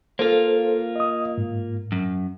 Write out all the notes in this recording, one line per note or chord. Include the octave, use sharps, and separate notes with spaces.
A#3 F4 A4 C5
D#5 D#6
G#2
F#2